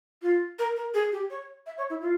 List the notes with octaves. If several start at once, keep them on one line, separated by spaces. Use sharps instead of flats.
F4
A#4
A#4
G#4
G4
C#5
E5
C#5
E4
F4